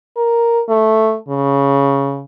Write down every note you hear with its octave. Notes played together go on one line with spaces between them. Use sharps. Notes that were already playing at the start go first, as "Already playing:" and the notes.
A#4
A3
C#3